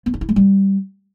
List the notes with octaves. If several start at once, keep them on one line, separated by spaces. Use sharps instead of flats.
B3
D#4
E4
G#3
G3